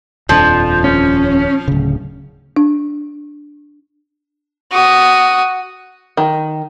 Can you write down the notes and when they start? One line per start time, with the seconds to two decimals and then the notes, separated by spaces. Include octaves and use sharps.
0.29 D#1 F2 F3 D4
0.84 C#4
1.68 D1 C#3
2.56 D4
4.72 F#4 D#6
6.17 D#3